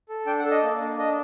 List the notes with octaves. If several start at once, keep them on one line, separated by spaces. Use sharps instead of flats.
A4
D4 G5
F#5
A4
D#5
A#3
D4
D4 D#5